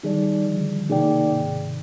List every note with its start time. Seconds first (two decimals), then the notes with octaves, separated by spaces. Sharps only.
0.03 D#3 G3 D#4 G#4 D5
0.46 D3 F3
0.89 C3 D#3 A#3 D#4 G#4 D5 G5
1.31 G#2 C3